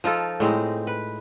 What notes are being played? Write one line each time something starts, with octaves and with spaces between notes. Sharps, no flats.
F3 D#4 F4 A4
A2 G#3 C4 D#4
B4